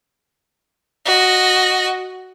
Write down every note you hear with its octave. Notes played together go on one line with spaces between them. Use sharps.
F#4 D#5